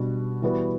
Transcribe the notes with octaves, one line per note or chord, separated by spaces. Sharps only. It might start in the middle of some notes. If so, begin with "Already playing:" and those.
Already playing: B2 G3 D4 F#4 B4
E3 G3 B3 F#4